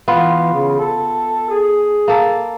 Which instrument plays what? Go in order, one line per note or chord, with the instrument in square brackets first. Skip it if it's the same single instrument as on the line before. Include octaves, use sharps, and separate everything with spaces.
[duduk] E3 [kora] B3 F4
[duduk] C#3
A4
G#4
[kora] A#3 A4